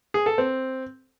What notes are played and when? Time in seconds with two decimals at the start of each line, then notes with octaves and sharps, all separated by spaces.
0.14 G#4
0.26 A4
0.38 C4